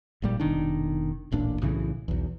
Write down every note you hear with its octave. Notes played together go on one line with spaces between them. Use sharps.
G#1 A#2 G3
F1 B2 D#3 D4
D1 A1 A#2 D4
B1 A2 C#3 E3
B1 E2